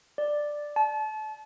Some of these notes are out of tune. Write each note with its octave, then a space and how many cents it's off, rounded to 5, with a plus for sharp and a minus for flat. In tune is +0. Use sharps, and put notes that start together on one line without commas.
D5 +10
A5 -30